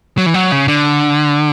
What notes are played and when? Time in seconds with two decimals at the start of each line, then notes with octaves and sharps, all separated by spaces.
0.18 F#3
0.26 E3
0.34 F#3
0.52 C#3
0.68 D3